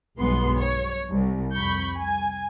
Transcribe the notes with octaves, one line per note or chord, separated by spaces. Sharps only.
B1 G2 G#3 B3 C6
C#5
C2
F2 B5 C#6 G6
G#5